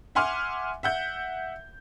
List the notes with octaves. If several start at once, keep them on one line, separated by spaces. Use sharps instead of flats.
E5 F#5 G#5 C6 D6 F6
E5 F#5 G6